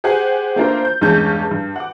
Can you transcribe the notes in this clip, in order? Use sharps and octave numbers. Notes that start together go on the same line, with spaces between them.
G4 G#4 C5 F#5 G#5
A3 A#3 D4 F4 A#4 C5
G6
E2 G2 G#3 C#4 A5 G6
G2
F#5 D6